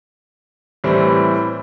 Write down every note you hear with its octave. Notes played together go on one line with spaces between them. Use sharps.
A2 E3 G3 C4